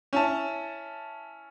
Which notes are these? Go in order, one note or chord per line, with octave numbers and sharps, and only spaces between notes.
C#4 E4 A5